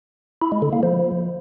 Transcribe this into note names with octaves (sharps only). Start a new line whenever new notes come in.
E4
G#3
D3
A#3
F3